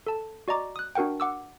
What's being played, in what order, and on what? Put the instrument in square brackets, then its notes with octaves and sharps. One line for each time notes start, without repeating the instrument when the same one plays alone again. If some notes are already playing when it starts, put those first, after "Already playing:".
[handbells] A4 A5
F#4 D5 D#5 A#5 D6
D#6 F#6
D4 F#4 A#4 F#5 G5
F#5 D6 E6